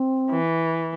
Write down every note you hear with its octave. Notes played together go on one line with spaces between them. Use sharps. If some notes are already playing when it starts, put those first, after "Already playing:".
Already playing: C4
E3